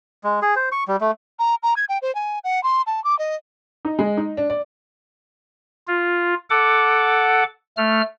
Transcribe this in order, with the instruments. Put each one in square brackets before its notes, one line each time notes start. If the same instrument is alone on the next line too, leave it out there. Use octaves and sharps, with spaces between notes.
[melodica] G#3
G#4
C5
C#6
G3
A3
[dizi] A#5
A#5
G#6
G5
C5
G#5
F#5
C6
A5
D6
D#5
[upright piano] D#4
G#3
D#4
D4
D5
[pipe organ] F4
A4 F#5 D6
A3 F6